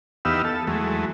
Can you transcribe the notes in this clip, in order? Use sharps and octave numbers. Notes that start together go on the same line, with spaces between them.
E2 B3 D#4 G4 F5 E6
A4
E2 F#3 G#3 A3